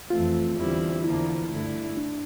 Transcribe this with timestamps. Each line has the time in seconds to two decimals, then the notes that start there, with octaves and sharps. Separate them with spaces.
0.10 F2 E3 A3 C4 F4
0.57 E2 D3 G3 C4 E4
1.04 E2 D3 F3 A#3 E4
1.51 G2 D3 A3 E4
1.97 D4